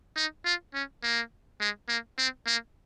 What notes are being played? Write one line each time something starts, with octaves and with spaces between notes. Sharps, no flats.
D#4
F4
C#4
A#3
G#3
A#3
C4
A#3